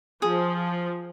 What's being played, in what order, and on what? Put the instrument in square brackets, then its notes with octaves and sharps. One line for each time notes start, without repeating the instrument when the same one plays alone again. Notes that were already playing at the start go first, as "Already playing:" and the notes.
[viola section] F3 [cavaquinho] G#4